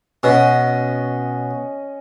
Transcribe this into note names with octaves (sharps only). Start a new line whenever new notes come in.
B2 C#4 D#5